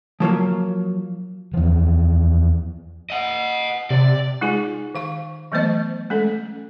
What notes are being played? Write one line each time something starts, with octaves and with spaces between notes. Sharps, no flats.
F3 F#3 A#3 F4
E2 F3
D#5 F#5
C3 D5
G#3 D#4 F4 G#4 G#5
D#3 F5 C#6
E3 F#3 A3 B3 C5 D#5
G#3 A3 C#4 A4